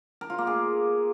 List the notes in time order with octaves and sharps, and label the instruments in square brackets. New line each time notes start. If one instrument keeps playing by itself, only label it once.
[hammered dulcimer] A#4
F4
A#3
G#4